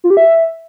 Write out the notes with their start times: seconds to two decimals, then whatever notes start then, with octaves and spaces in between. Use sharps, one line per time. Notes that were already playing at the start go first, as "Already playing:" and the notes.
0.04 F4
0.10 G4
0.17 E5